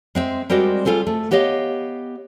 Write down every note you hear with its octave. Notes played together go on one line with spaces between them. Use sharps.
G#3 C4 E5
G3 G#3 C4 F#4 A#4 D5
G3 F4 G#4 A4 C5
A3
B3 G4 C#5 D#5 F5